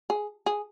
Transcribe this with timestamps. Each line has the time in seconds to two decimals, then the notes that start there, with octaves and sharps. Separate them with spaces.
0.10 G#4
0.46 G#4